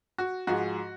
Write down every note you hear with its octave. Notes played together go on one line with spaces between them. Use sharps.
F#4
G#2 F3 G#3 F#4